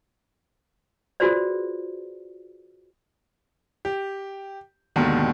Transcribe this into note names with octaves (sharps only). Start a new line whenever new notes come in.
F4 F#4 G#4 B4 C5 D5
G4
D#2 G#2 B2 D3 D#3